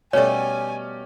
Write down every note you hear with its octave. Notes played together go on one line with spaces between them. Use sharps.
B2 G3 A3 C#4 G4 C#5 D5 G#5